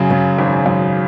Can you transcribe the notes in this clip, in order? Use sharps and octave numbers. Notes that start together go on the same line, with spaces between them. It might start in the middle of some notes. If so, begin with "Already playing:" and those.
Already playing: F#2 C#3 G#4
C#3
G#1
F#2